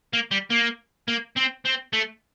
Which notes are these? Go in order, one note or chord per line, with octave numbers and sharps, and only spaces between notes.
A#3
G3
A#3
A#3
C4
C4
A3